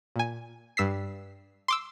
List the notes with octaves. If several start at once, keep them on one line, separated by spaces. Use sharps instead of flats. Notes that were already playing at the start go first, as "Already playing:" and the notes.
A#2 G#5
G2 E6 B6 C7
C6 D6 E6